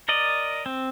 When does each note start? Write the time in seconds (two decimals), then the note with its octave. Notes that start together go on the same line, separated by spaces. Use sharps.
0.08 A#4 D5 D#5
0.66 C4